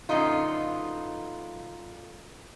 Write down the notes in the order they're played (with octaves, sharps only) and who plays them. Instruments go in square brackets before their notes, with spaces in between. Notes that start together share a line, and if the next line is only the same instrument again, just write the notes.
[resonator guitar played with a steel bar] F#2 A#2 D3 B3 D#4 F4